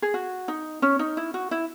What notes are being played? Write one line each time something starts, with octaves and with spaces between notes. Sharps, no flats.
G#4
F#4
D#4
C#4
D#4
E4
F#4
E4